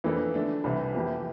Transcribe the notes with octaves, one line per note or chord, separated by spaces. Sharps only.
F2 E3 A#3 D4 A4
D3 A3 D4
C2 C3 E3
F2 E3 A#3 E4 G4